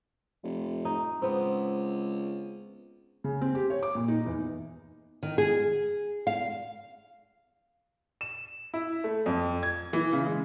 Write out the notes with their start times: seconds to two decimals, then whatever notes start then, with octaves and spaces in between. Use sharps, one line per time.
0.44 F1
0.85 D#4
1.22 C#2 B3 C4
3.24 C#3
3.41 C4
3.55 G4
3.70 C#5
3.83 D6
3.95 A#2
4.08 D#4
4.26 E2
5.23 D#3
5.38 G#4
6.27 F5
8.21 E7
8.74 E4
9.04 A3
9.26 F2
9.63 G#6
9.93 E3
10.13 C#3
10.26 G#3